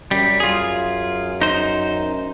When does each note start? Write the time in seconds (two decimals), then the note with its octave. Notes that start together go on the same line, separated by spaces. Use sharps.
0.11 F#2 G3
0.40 F4 G#4
1.41 D#4 C5